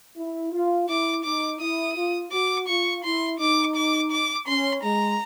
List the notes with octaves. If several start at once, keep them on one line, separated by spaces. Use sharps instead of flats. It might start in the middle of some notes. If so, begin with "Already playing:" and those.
E4
F4
E4 D6
D#4 D6
E4 D#6
F4
F#4 D6
F4 C#6
E4 C6
D#4 D6
D6
D6
C#4 C6
G#3 A#5